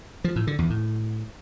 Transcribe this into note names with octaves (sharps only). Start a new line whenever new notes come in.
F3
A2
D3
E2
A2